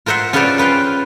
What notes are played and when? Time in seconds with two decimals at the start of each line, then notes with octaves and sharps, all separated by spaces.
0.06 F4 A#4 C5 E5 F#5
0.33 C#4 F4 G#4 B4 C5 D5
0.58 F4 B4 F5 G5